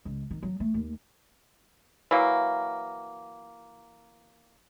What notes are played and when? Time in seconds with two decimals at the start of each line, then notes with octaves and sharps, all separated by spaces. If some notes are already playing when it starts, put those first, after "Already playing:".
0.05 C#2
0.31 D#3
0.43 F#3
0.60 A3
0.74 D#2
2.11 E3 F#3 A#3